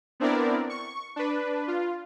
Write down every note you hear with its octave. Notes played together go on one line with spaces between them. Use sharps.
B3 C4 D4 E4 A#4 D5
C#6
D4 B4
F4